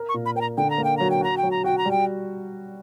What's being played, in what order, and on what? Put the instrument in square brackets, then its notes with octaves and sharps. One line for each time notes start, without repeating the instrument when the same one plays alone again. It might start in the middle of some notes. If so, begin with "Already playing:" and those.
Already playing: [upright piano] A#4
[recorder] C#6
[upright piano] A#2
[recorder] B5
[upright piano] A#4 [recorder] G5
[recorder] A#5
[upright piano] D3 [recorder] G5
[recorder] A#5
[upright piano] A#3
[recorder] G5
[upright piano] F#3 [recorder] A#5
[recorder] G5
[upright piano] F#4 [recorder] A#5
[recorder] G5
[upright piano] F#3
[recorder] A#5
[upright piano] F#4 [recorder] G5
[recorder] A#5
[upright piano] G3
[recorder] G5